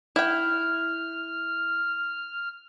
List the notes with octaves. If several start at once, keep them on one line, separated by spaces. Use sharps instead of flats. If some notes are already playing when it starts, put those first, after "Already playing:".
E4 G5 F6